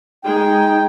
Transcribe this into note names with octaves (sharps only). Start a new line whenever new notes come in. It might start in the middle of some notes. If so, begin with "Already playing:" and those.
G#3 D#4 G#4 G5